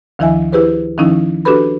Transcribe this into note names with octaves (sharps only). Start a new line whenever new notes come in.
D2 D#3 F3 E4 E5 G#5
E4 G4 G#4 B4 C5
D#3 F3 C#4 D#4 E4
D4 F#4 G4 A4 B4 B5